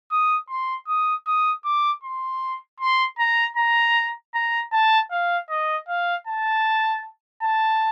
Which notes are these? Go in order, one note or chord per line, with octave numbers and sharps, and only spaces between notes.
D#6
C6
D#6
D#6
D6
C6
C6
A#5
A#5
A#5
A5
F5
D#5
F5
A5
A5